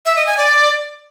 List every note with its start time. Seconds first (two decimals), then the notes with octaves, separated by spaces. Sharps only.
0.06 E5
0.16 D#5
0.27 G#5
0.37 D5